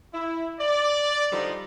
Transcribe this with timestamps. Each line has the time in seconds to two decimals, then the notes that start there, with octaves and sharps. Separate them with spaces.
0.12 E4
0.59 D5
1.32 D3 F3 G3 D#4 F4